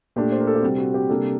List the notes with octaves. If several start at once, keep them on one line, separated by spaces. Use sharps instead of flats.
A#2 A3 D4 G4
C5
A#4
A4
G4
C3 G3 C4 F#4
F#4
G4
C3 G3 A#3 D4 A4